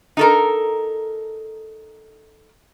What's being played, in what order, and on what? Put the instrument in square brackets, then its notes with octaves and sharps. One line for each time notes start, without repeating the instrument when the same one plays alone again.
[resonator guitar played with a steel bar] D#4 A4 A#4